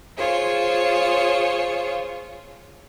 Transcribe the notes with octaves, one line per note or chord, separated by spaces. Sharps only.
F4 G#4 C5 C#5